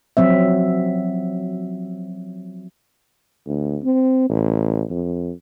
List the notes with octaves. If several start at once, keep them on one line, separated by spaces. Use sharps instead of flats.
F3 F#3 C4 E5
D2
C4
A1
F2